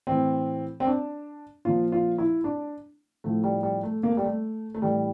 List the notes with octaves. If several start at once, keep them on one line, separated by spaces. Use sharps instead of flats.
A2 E3 C4
C4
D4
A#2 F3 F4
F4
E4
D4
A2 F3 A3
G3
G3
A3
A#3
A3
G3
A3
A3
A2 E3 G3